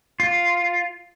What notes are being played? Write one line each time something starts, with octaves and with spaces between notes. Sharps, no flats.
F4